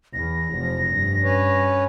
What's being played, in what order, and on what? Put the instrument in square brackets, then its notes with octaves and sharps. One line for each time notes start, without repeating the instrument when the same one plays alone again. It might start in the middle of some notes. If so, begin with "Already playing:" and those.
[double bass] E2 [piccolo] A#6
[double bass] F1 F3
G2
[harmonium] C#4 B4 C#5